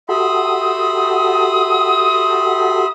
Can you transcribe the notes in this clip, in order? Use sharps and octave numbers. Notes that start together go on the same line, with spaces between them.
F#4 G4 A4 E5 B5 C6 D#6